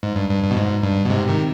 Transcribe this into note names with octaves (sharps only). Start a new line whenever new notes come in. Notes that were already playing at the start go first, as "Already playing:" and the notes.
G#2
G2
G2
G2
B2
G#2
G2
B2
G#2 C3
C3 D#3